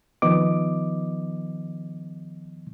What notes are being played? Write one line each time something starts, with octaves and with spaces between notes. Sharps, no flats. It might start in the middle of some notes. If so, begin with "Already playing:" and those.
D#3 F3 B3 D#5 D6